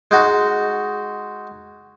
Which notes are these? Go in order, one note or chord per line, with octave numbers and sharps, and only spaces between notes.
G#3 D#4 F#4